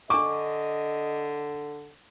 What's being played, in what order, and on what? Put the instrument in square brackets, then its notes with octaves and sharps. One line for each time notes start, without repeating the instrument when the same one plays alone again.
[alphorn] D3 [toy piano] D4 C#6 [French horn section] D#5 [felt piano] D6